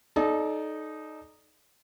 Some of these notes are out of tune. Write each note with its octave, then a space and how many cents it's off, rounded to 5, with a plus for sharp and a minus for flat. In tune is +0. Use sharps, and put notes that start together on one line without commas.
D#4 -5 A4 -35 D5 -5